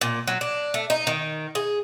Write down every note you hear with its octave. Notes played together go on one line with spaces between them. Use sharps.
A#2
F#3
D4
A3
D#4
D#3
G#4